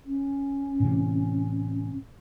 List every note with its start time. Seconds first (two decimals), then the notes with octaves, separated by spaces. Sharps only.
0.05 C#4
0.80 A2 C3 E3